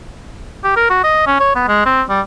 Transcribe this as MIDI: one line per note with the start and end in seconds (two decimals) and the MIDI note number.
0.64 0.75 67
0.76 0.89 70
0.90 1.03 66
1.04 1.24 75
1.27 1.36 61
1.40 1.53 73
1.56 1.64 59
1.68 1.85 56
1.86 2.02 60
2.09 2.21 55